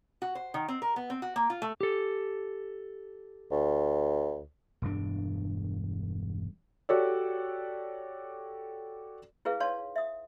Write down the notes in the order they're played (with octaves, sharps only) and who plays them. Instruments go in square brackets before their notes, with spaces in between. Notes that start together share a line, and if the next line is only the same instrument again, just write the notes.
[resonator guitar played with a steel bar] F#4
C5
D#3
C4
A#4
B3
C4
F#4
A#3
F4
A3
[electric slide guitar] G4 A4
[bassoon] D2
[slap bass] E1 G2 D4
[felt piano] F#4 G4 A4 C#5 D5
[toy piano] E4 G#4 B4 F5
D#4 C#5 F5 A5 C6
E5 D#6